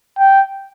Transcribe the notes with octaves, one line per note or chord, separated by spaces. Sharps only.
G5